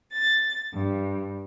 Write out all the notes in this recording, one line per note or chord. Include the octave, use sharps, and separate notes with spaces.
A6
G2